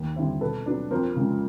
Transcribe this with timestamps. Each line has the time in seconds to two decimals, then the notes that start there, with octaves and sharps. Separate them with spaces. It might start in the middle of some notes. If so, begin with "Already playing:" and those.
Already playing: D#2
0.16 D3 G3 C4 E4
0.41 B2 A4 B4
0.66 F#3 B3 D4
0.91 F2 A#4 C5
1.16 C#3 F3 G#3